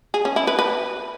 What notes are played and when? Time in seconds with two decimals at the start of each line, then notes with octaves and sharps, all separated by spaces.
0.14 G#4
0.25 C#4
0.36 E4
0.47 B4
0.59 B4